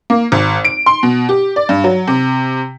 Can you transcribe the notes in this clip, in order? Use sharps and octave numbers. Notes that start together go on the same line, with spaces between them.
A#3
G#1
D7
C6
B2
G4
D5
G2
F#3
C3